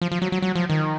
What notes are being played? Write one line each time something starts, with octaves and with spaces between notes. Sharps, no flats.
F3
F3
F#3
F#3
F#3
F3
D#3